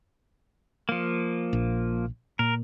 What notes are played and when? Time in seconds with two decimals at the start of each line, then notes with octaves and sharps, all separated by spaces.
0.89 F3 A#3
1.53 A#1
2.39 A#2 A#4